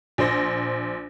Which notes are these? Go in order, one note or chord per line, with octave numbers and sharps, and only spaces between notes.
A#1 C5 A#6